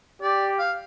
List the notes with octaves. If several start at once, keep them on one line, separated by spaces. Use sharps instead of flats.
G4 D5
F5